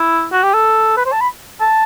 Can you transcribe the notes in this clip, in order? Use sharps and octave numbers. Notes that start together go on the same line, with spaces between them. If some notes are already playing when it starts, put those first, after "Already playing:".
Already playing: E4
F#4
G4
A4
B4
C5
A5
B5
A5